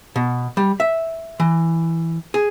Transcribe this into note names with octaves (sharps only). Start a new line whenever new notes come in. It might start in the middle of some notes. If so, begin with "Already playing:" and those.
B2
G3
E5
E3
G#4